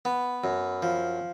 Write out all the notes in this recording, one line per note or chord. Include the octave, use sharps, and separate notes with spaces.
B3
F#2
F3